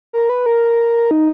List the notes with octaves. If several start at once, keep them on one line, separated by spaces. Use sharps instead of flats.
A#4
B4
A#4
D#4